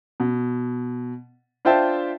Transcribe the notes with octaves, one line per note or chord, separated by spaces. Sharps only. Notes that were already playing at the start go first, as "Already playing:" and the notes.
B2
D4 F4 C5 E5 G5 A5